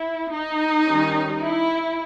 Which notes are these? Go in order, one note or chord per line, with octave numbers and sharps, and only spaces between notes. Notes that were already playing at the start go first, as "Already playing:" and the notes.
Already playing: E4
D#4
D#3 G3 C#4
E4